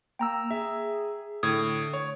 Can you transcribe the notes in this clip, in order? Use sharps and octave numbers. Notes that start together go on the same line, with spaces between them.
A#3 G5 A#5 E6
G#4 E5
A2 D3 D#6 G#6
C#5